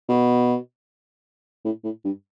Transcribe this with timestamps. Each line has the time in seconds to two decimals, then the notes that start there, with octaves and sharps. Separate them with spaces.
0.09 B2
1.65 A2
1.84 A2
2.04 G2